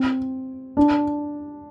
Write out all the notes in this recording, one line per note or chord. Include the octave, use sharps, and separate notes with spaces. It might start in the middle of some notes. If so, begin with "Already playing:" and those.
Already playing: C4
D4